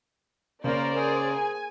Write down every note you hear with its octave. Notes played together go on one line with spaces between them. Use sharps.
C#3 A#3 C#4 A#4 C5 D5
G#4
G#5